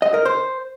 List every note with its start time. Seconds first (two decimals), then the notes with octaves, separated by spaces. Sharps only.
0.02 D#5
0.14 A#4
0.25 C5